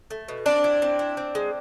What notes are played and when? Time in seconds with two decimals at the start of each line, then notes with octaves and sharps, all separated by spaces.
0.10 A3
0.28 B2
0.46 C4 D4 D5
0.64 E4
0.82 C4
0.99 E4
1.17 C4
1.35 G#3